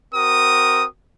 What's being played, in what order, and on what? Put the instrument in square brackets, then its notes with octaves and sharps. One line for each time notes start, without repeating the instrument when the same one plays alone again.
[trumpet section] C4 F#4 A#4 D#6